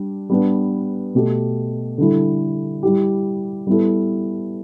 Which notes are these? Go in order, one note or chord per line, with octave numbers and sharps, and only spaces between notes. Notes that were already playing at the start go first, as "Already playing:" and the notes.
Already playing: G3 D4
G3 B3 D4
B2 A3 G4
D3 G3 E4 A4
G3 E4 G4
G3 B3 E4 A4